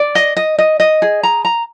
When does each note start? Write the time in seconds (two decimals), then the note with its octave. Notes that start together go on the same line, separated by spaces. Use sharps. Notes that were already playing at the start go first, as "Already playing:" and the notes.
Already playing: D5
0.15 D#5
0.37 D#5
0.59 D#5
0.80 D#5
1.02 G#4
1.23 A#5
1.45 A#5